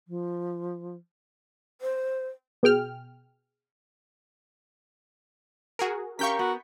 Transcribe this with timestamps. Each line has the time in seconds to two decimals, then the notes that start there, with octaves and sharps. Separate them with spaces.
0.08 F3
1.81 C5
2.63 B2 G#4 G5 F6
5.79 F#4 G#4 A#4
6.19 C#4 G4 A#4 F5 C#6 G6 B6
6.39 B3 F#4